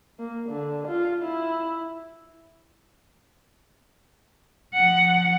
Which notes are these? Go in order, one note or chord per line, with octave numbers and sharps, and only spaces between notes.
A#3
D3
F4
E4
F3 F#5